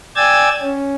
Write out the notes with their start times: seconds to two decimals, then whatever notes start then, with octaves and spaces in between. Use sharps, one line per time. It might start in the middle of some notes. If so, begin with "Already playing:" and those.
0.16 D5 G5 G#5 E6 G#6 A6
0.61 C#4